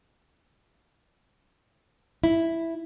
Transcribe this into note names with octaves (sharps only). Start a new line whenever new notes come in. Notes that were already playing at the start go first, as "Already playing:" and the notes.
E4